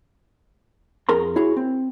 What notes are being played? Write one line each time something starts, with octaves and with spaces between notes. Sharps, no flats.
F2 G#4 A#4 A#5 C6
E4 F#4 G#4 C#5
C4